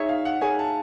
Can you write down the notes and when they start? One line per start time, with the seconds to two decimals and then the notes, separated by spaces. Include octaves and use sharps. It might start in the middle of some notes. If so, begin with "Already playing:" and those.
Already playing: D#4 G#4 C#5 E5
0.09 F5
0.25 F#5
0.41 D#4 G#4 C#5 G#5
0.59 A5